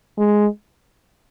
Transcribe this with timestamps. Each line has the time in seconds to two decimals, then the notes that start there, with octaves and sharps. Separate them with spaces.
0.18 G#3